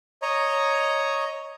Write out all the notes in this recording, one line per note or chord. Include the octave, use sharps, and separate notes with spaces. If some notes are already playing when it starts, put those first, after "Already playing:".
C#5 D#5 A#5